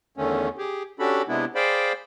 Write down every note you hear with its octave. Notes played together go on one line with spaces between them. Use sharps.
E2 D3 D#3 A3 C#4
G4 G#4
C#4 D4 F#4 G4 A4 B5
C3 G#3 B3 D4 E4
G#4 C5 D5 F5 G5 B5